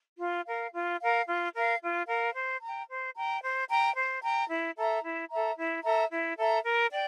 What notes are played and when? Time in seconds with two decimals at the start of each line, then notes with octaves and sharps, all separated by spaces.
0.19 F4
0.46 A#4 F5
0.73 F4
1.00 A#4 F5
1.27 F4
1.55 A#4 F5
1.81 F4
2.08 A#4 F5
2.34 C5
2.61 G5 A#5
2.89 C5
3.16 G5 A#5
3.42 C5
3.69 G5 A#5
3.96 C5
4.23 G5 A#5
4.49 E4
4.76 A4 E5 A#5
5.03 E4
5.30 A4 E5 A#5
5.57 E4
5.84 A4 E5 A#5
6.10 E4
6.38 A4 E5 A#5
6.64 A#4
6.92 D5 G5